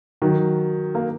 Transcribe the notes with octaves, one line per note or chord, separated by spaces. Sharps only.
D#3 F#3
A#3